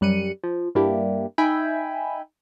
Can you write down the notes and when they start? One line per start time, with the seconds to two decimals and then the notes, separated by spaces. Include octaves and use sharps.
0.01 F#2 G3 F#6 C#7 D#7
0.43 F3
0.75 G2 A#3 D4 E4 G4
1.38 D#4 E5 G5 G#5 B5